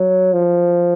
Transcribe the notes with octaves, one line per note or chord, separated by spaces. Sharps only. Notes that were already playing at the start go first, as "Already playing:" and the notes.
Already playing: F#3
F3